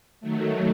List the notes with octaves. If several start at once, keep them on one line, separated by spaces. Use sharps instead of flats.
D#3 F#3 A3